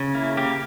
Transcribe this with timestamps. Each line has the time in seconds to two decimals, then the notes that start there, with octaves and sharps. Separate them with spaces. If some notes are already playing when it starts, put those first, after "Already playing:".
Already playing: C#3
0.15 A#3 E4
0.37 A#3 G4